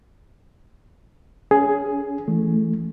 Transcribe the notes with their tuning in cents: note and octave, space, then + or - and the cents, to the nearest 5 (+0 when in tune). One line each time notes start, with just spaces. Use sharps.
C#4 +25 G#4 +10
E3 +20 A3 +0